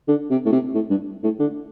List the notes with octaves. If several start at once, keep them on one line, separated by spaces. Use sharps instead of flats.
D3
C3
A2
C3
A2
G2
A2
D3